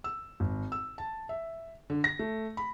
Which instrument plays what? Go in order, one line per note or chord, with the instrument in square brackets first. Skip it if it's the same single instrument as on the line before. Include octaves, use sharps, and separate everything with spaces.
[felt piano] E6
G#1
E6
A5
E5
D3
A#6
A3
B5